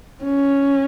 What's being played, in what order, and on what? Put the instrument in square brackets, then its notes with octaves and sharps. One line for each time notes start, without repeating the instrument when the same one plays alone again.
[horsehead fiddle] C#4